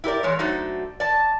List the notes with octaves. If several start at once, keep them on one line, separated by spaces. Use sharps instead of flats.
E4 G4 A#4 D5
E2 G#3 C#5
F#3 A3 D4 D#4 F#4 C5
D5 A5